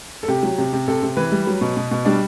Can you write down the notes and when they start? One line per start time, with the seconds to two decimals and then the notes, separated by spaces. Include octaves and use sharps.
0.23 A4
0.28 C3 G4
0.43 F#3
0.58 C3
0.73 C3
0.88 C3 A4
1.03 C3
1.17 E3 B4
1.32 G3
1.47 F#3
1.61 B2
1.77 B2
1.91 B2
2.05 G3 D4